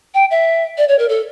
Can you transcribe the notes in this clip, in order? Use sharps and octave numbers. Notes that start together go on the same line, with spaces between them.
G5
E5
D5
C#5
A#4
A4